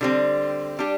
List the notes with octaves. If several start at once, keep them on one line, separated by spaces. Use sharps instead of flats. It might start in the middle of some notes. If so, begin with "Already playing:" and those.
D3 G3 C4
G3 D4 G4